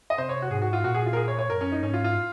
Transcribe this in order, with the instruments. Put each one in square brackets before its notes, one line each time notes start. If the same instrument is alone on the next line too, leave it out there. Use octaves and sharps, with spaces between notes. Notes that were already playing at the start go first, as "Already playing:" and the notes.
[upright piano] D#5
[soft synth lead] C3 [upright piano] C5
[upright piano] C#5
F#4
[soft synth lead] G#2 [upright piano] G#4
[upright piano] F#4
F4
[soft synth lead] A#2 [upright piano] F#4
[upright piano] G#4
F4
A#4
G#4
C#5
C#5
[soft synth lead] F#2 [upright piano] A#4
[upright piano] C#4
D#4
[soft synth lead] G#2 [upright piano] C#4
[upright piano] F4
F4